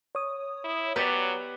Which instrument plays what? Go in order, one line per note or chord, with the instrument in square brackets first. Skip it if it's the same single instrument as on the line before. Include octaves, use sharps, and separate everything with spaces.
[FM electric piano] C#5 D#6
[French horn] E4
[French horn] F#3 [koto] B3 G4 D5